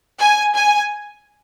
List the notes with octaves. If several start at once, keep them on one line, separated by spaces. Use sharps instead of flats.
G#5
G#5